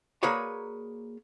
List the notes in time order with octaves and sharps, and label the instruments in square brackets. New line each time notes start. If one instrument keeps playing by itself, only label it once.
[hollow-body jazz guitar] A#3 F#4 G#4 B4 C#5 D5